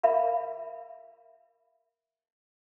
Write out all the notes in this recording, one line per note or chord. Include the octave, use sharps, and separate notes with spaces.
A#4 E5 F5 B5